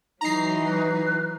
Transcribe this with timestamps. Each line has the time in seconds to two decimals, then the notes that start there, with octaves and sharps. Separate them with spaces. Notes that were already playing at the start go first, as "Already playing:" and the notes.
0.21 E3 F#3 D#4 A#5 C7
0.63 B4